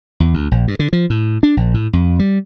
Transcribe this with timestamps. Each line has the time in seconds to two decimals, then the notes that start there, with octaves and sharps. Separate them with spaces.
0.20 E2
0.34 D2
0.51 A#1
0.68 G2
0.79 D3
0.93 F3
1.10 A2
1.43 D4
1.57 A#1
1.74 A2
1.93 F2
2.19 G3